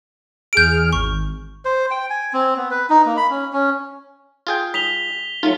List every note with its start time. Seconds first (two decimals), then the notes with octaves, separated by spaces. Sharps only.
0.53 E2 G#4 F6 G6 D7
0.93 G#1 C#6
1.65 C5
1.91 G5
2.10 G#5
2.33 C4
2.57 B3
2.71 B4
2.90 D#4
3.06 A#3
3.17 B5
3.30 C#4
3.53 C#4
4.47 F4 G#4 G5
4.74 D#6 B6 F7 G7
5.43 F#3 A3 D#4 F4